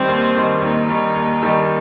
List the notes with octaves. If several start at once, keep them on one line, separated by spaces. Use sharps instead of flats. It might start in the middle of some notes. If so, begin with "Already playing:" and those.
Already playing: D#3 G3 C4
D#2
D#3 G3
D#2 D#4
D#3 G3
D#2
D#3 G3